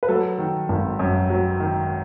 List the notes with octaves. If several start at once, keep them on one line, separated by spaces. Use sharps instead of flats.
B4
F#3 A4
D#3
G#1
F#2
F#3
D#3